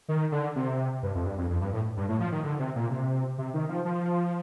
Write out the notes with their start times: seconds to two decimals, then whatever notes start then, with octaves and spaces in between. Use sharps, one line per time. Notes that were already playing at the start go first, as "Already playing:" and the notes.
0.09 D#3
0.32 D3
0.56 C3
1.03 G2
1.15 F2
1.26 G2
1.38 F2
1.50 F2
1.61 G2
1.73 A2
1.97 G2
2.09 A2
2.20 F3
2.32 D#3
2.44 D3
2.59 C3
2.76 A#2
2.91 C3
3.38 C3
3.54 D#3
3.69 F3
3.85 F3